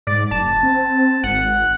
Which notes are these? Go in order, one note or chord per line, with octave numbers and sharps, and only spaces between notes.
G#2 D5
F#1 A5
C4
G#1 F#5